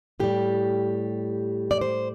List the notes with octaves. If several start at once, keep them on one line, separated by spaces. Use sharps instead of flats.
A2 G3 G4
D5
C5